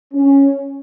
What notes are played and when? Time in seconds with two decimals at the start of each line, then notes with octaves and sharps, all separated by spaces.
0.14 C#4